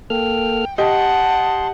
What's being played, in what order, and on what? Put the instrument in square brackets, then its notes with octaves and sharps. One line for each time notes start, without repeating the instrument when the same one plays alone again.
[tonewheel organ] A#3 A4 F6 [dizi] G5
[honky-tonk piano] G4 D#5 [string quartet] F#5 [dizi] A5 [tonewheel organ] C6